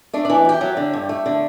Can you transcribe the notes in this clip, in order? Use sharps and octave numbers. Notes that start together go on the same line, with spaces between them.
A3 D4
D4
E3
F#2 G4
F#3
D3
G2
A3
D3